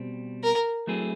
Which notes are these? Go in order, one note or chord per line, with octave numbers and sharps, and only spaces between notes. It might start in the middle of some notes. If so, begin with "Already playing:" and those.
Already playing: B2 G3 C4
A#4
F#3 A3 C4 E4 G#4